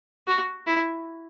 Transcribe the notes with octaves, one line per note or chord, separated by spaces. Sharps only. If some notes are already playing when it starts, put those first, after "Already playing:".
F#4
E4